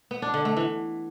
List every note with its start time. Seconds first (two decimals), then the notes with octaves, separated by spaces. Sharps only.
0.11 B3
0.22 D4
0.34 D3
0.45 A3
0.57 E3